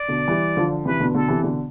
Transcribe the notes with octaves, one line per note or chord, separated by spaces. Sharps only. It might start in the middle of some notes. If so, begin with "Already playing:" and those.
Already playing: D5
B2 D3
E3 G3
D3 F3
C3 E3 B4
B2 D3
B2 D3 A4
C3 E3
B2 D3